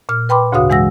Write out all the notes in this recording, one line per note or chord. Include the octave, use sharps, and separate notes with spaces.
A#2 F6
B4 G5 B5 C6 D6
D2 G#2 C#3 F#4 F5 D#6
E3 G#3 F#5 E6 A#6